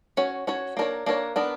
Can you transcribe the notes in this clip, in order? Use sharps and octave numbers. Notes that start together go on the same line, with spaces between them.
C#4 F#4 C#5
C#4 F#4 C#5
A#3 D4 A#4 C#5
A#3 D4 A#4 C#5
B3 D4 A#4